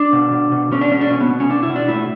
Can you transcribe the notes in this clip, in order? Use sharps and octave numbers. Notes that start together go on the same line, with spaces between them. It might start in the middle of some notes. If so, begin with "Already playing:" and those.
Already playing: D4
B2
B2
B2
B2 C#4
D4
B2 C#4
D4
B2 C#4
B3
B2
C#4
B2 D4
E4
B2
D4
A2 E4